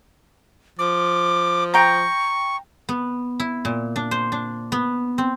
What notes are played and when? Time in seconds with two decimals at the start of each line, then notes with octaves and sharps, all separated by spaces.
0.79 F3 D6
1.74 G5 A#5 C#6
2.89 B3
3.40 E4
3.65 A#2
3.96 D4
4.11 C5
4.32 D4
4.72 B3
5.18 C4